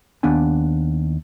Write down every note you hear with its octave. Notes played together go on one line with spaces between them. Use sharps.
D#2 B3 D4 G#5